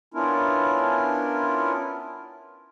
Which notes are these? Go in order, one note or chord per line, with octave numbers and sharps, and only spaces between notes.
B3 C#4 D4 E4 F4 A#4